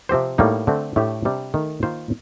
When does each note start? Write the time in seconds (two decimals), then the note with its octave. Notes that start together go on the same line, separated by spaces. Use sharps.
0.09 C3 F3 C4 G4 C5
0.38 A2 G3 A#3 D#4
0.67 D3 A3 C4
0.96 A2 A3 D4 G4
1.25 C3 G3 D4
1.54 D#3 A3 D#4
1.83 D#3 A#3 F4 C5